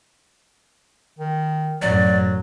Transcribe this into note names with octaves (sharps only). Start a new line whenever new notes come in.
D#3
A1 F#2 A2 F#3 D5